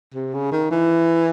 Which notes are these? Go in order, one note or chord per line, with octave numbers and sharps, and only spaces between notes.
C3
C#3
D#3
E3